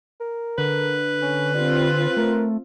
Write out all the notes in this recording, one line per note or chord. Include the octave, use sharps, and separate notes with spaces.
A#4
D3 B4
C#4
G3 C4 F4
A3 A#4